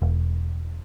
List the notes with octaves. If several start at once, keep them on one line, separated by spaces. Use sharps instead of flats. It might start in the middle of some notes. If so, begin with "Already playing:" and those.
E1